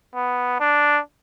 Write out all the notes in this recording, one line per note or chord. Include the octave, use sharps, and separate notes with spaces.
B3
D4